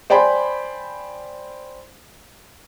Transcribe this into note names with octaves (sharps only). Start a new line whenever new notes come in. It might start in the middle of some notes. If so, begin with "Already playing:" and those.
C5 D5 G5 G#5 B5 C6